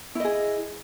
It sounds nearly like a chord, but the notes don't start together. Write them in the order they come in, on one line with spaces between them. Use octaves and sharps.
E4 D#5 G#4